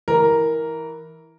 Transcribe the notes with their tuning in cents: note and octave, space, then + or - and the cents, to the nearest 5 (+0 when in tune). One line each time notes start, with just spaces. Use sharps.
E3 -10 A#4 +0